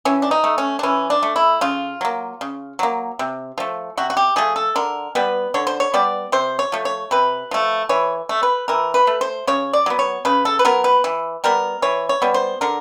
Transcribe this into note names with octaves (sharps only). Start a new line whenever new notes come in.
E3 C#4
D4
D#4
A3
C#4
D4
E3 C#4
D4
A3
E4
C#3 F4
F#3 A#3
C#3
F#3 A#3
C3
F3 A3
C3 F#4
F#4
G4
F3 A3 G#4
A4
D3 A#4
G3 B3 B4
D3 C#5
C5
C#5
G3 B3 D5
C3 C5
C#5
F3 A3
C#5
C3 B4
F3 A3
E3 C#5
A3
B4
E3 A#4
B4
A3
C5
C#3 C#5
D5
F#3 B3
C#5
C#3 B4
A4
B4
F#3 B3 A#4
B4
E3
G3 B3 A#4
E3 C#5
C#5
G3 B3
C5
D3 A#4